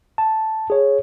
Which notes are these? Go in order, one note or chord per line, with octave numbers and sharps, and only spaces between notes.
A5
G#4 C#5